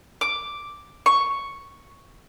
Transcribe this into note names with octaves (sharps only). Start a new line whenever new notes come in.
D6
C#6